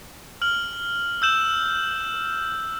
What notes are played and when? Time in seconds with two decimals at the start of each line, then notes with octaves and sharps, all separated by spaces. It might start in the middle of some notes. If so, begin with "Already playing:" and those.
0.42 F6 F#7
1.22 E6 G6 E7